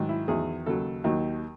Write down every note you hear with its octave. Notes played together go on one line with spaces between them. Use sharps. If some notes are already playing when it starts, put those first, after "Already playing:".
Already playing: G#2 D#3 F#3
E4
E2 D#3 F#3 G#4
D#2 C#3 F#3 A4
D#2 D#3 F#3